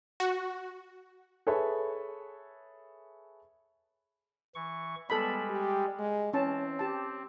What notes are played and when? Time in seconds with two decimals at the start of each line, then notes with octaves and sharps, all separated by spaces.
0.20 F#4
1.47 G#4 A4 B4 C#5 E5
4.55 E3 C#6
5.10 G3 G#3 B3 A4 B5
5.49 G4
5.99 G#3
6.34 E3 C4 C#4 A5
6.79 G4 A5